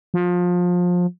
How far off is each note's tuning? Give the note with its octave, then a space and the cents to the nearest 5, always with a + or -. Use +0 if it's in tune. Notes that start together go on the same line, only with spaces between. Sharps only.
F3 +25